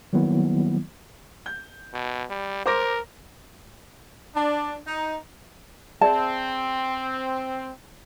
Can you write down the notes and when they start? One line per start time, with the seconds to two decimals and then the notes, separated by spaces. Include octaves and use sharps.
0.13 D#3 F#3 G3 A#3 B3 E4
1.46 G6
1.93 B2
2.30 G3
2.66 A#4 C5 D6 A#6
4.35 D4
4.87 D#4
6.01 C4 G#4 D5 E5 A5